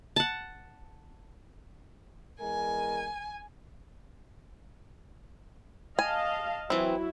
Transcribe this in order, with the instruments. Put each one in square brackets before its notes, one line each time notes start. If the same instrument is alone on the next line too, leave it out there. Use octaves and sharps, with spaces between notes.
[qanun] F#5 A5
[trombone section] E2 G#3 A#4 [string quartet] G#5
[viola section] D#5 F5 A5 [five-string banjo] G#5
[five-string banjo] E3 C4 [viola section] F#3 E4